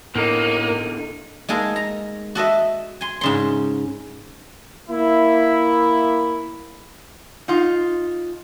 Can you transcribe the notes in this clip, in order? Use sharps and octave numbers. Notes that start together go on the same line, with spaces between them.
E2 A2 D3 A#3 D#4
G#3 A#3 D#4 A4 A#4
A#5
F#4 A4 D#5 E5
G#5 C6
G#2 C#3 C6
A#3 E4
D#4 F4